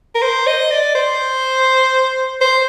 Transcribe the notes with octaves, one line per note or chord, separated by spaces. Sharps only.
A#4
C5
D#5
D5
C5
C5